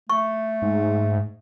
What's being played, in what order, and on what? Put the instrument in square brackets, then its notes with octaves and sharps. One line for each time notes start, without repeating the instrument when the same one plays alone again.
[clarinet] A3 [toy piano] C#6
[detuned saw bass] G#2